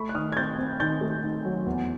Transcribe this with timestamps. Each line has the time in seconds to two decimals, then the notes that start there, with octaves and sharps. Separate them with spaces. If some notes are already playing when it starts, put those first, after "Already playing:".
Already playing: A3 B5 C#6
0.09 F#6
0.15 D#3 D#6 F6
0.32 G#6
0.37 C4 G6 A6
0.58 C4
0.80 D#3 G6 A6
1.01 A3
1.23 D#3
1.45 F#3
1.66 E2